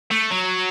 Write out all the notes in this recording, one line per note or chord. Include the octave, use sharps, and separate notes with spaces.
A3
F#3